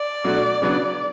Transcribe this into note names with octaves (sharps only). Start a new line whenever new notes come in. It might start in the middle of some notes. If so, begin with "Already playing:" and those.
Already playing: D5
B2 F#3 A3 D4 F#4
C#3 F#3 B3 D4